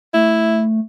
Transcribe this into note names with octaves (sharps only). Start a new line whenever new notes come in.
A3 E4